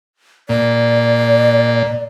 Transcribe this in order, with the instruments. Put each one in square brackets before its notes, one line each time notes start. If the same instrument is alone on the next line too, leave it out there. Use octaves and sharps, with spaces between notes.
[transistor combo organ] A#2 [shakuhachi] D5